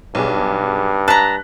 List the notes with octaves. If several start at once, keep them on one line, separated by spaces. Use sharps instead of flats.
B1 G2 G#4
A5 A#5 F#6 B6